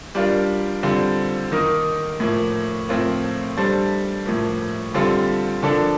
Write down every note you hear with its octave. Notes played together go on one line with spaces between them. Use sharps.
G3 D4 F4 A#4
D3 G3 C4 F4 C5
D#3 A#3 D#4 A#4
A2 F3 A#3
A2 F3 C4 F4 A#4
G3 D4 A4 C5
A2 F3 A#3
D3 G3 C4 F4 A4
D3 F3 A#3 D4 A4